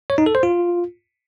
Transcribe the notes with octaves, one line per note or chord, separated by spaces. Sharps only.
C#5
D#4
A4
C5
F4